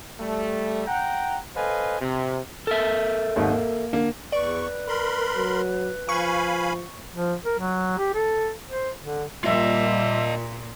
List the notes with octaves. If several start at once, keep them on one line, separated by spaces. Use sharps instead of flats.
G3 A3
F#5 G5 A#5
A4 B4 C5 D#5 F5 G#5
C3
A4 A#4 E5
G#1 D#2 G#2
A#3
D3 A#3
E2 B4 D5 C#6
A#4 B5 C6
F#3
F3 F5 G#5 B5 C#6
F3
A#4
F#3
G4
A4
C5
D3
A#2 G3 F4 D#5 E5